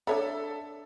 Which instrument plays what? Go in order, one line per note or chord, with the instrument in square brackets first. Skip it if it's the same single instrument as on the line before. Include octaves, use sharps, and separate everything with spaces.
[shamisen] D3 C#5 B5 [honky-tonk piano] A4 E5